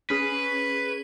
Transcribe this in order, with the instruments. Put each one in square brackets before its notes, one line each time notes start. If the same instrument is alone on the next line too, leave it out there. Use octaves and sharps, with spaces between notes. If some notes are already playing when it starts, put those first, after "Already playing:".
[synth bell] C#4 G#4 [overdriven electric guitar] B4